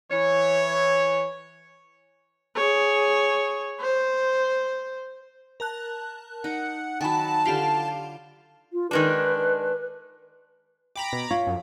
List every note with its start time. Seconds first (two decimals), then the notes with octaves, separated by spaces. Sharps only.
0.11 E3 C#5
2.56 G#4 C#5
3.80 C5
5.60 A#4 A5 F#6
6.44 D#4 F#5
7.01 D#3 F#3 F#5 G#5 A5 B5
7.45 D3 F4 G4 F5 B5
8.73 F4
8.91 D#3 G#3 D4 B4
10.95 G5 A#5 B5 D6
11.13 B2
11.31 F4 C#5 F5
11.47 F#2